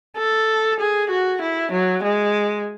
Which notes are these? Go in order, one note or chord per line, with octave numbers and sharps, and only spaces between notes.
A4
G#4
F#4
E4
F#3
G#3